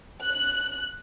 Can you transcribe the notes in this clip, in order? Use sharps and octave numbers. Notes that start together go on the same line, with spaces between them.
F#6